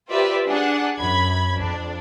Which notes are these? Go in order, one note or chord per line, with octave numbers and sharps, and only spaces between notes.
F4 G4 B4 C5 D5 E5
D4 G#4 F#5
F#2 B5 G#6
F2 D4